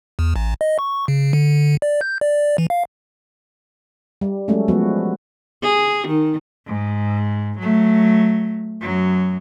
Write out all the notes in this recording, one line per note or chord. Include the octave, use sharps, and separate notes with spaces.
E2
A1
D#5
C#6
C#3
D3
D5
G6
D5
E3
F5
G3
F#3 G#3 A3 C#4
F3 G#3 B3 F#4
G#4
D#3
G#2
F#3 A3
F#2 F#3